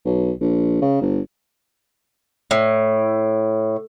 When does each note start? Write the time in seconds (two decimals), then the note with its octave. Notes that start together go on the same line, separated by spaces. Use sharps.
0.05 B1
0.40 A#1
0.81 C#3
1.01 G1
2.51 A2